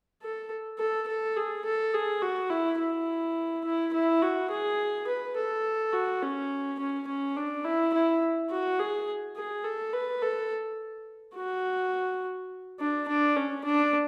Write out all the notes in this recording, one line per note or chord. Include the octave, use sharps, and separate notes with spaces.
A4
A4
A4
G#4
A4
G#4
F#4
E4
E4
E4
E4
F#4
G#4
B4
A4
F#4
C#4
C#4
C#4
D4
E4
E4
F#4
G#4
G#4
A4
B4
A4
F#4
D4
D4
C#4
D4